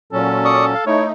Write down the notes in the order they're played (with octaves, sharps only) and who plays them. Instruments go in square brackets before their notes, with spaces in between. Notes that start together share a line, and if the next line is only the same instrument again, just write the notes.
[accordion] A#2 F#3 C#4 [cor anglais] A4
[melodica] D5 C#6 D#6
F5
[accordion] A3 D#4 [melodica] E4 [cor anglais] C#5